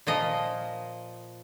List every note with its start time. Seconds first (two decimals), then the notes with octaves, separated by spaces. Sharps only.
0.07 A#2 F3 D#5